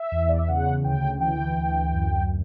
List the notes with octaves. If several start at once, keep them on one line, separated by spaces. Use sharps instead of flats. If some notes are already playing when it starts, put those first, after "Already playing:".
Already playing: E5
E2
D5
E5
C#3 F#5
D2 G5
E3 G5
D2
F#2